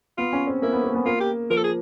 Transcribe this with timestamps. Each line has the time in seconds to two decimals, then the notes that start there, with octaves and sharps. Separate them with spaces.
0.18 B3 F4
0.33 C#4
0.47 C4
0.62 A#3 E4
0.73 B3
0.84 A#3
0.95 B3
1.06 A#3 F4
1.20 G4
1.50 F3 A#4
1.57 A4
1.64 G#4